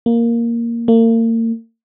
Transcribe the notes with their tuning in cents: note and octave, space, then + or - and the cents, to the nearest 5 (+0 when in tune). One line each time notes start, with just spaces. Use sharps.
A#3 +0
A#3 -40